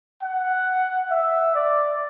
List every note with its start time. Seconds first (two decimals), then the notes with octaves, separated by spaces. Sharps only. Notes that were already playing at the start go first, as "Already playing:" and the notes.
0.23 F#5
1.10 E5
1.55 D5